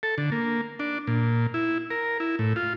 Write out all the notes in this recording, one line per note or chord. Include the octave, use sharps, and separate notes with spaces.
A4
D3
A#3
D4
A#2
E4
A#4
E4
A2
F4